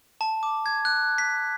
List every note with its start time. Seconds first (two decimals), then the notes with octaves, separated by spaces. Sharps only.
0.21 A5
0.43 D6
0.66 G#6
0.85 F#6
1.18 B6